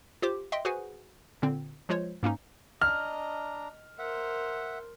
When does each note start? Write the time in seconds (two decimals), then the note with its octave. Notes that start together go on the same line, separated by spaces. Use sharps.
0.22 F4 G4 C5 D6
0.52 D#5 E5 G5 C6
0.65 F#4 G#4 B4 C5 F#5 G#5
1.42 A#2 D3 C4
1.89 F3 G#3 F4 C5 C#5
2.23 G#2 A#3 C#4 D#4
2.81 D4 D#5 A#5 F6
3.99 A#4 C5 E5 F#5